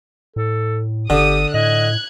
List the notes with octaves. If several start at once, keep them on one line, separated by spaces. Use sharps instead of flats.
A2 A4
G1 D3 G4 D#6
A2 D#5 F#6 G#6